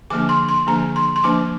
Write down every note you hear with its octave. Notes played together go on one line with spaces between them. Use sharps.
D3 F3 A#3 D4 D6
C6
C6
D3 F3 A#3 D4 A#5
C6
C6
F3 A#3 D4 D6